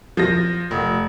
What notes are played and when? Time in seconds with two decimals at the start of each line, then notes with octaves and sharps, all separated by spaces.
0.17 F3 A#6
0.71 F1